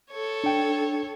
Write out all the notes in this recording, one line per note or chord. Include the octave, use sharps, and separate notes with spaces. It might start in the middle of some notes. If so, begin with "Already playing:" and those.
A4 C#5
D4 G5